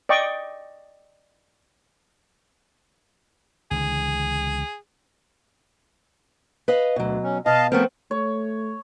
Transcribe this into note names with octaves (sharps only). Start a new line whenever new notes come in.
D5 D#5 G5 C#6
C#2 D3 E3 G#4
B4 D#5 F5
D2 B2 F#3
C#4
B2 D#5 F5 A5
F3 A3 B3 C4 A#4
A3 C#5